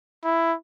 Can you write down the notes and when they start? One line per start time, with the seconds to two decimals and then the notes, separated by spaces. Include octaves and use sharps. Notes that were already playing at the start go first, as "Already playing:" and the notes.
0.24 E4